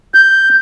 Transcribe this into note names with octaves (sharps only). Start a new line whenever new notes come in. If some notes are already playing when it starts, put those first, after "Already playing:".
G6